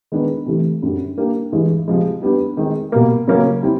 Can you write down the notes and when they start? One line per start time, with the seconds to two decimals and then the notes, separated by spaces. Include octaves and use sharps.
0.12 D#3 G#3 B3 D4
0.46 C3 E3 A3
0.82 F#2 D3 G3
1.17 G3 A#3 D4 G4
1.52 G2 E3 G#3
1.88 C3 F3 G#3
2.22 G3 B3 D4 G4
2.57 D#3 G#3 C4 D#4
2.92 B2 G3 A#3
3.27 C#3 F#3 A#3 C#4
3.63 G3 C4 E4